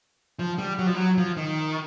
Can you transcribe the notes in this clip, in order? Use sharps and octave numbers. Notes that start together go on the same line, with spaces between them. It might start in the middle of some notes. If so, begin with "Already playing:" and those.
F3
G3
F#3
F3
F#3
F3
D#3